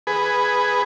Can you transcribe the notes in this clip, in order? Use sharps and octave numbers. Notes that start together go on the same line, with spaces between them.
G#4 B4